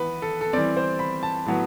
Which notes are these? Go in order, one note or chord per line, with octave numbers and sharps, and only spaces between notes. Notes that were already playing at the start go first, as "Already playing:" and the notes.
Already playing: E3 B3 B4
A4
A4
E3 G3 C4 D5
C5
B5
A5
A2 F#3 B3